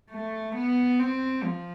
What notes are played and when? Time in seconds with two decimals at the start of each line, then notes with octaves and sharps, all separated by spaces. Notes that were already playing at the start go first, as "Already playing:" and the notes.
0.11 A3
0.55 B3
0.99 C4
1.43 F3